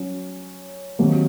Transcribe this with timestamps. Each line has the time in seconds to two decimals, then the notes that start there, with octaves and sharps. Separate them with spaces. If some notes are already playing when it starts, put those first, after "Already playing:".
Already playing: F#3 C#4
0.99 C3 D#3 F#3 A#3